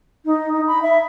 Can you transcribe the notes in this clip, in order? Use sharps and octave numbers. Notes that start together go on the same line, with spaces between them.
D#4
D#4
B5
E5